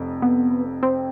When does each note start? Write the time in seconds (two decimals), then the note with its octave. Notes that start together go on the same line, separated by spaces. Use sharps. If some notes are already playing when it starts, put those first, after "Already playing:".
Already playing: F1 F2
0.22 B3
0.83 C4